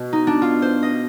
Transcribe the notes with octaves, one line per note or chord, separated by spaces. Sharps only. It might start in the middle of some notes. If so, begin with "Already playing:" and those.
Already playing: B2
D#4
D4
F4
C5
D#5